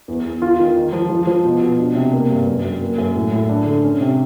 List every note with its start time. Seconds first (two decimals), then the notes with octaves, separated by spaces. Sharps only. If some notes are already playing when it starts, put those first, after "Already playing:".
0.08 E2
0.25 E2
0.42 F4
0.60 D#3
0.76 D#4
0.93 F3
1.10 F3
1.27 F3
1.45 B2
1.61 B2
1.79 D4
1.95 C3
2.13 A#3
2.30 G2
2.47 F#2
2.64 F#2
2.80 A#3
2.98 F#2
3.16 A2
3.32 A2
3.49 D4
3.66 D3
3.83 C#4
4.01 C3